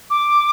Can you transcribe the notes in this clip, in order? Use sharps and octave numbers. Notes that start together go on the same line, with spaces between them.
D6